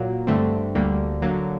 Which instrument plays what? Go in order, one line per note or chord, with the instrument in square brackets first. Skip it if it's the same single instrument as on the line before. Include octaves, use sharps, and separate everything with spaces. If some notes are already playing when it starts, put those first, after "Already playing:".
Already playing: [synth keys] A#2 F#3 A#3
G2 D3 A3 C4
D2 D3 G3 A#3
D3 F#3 A#3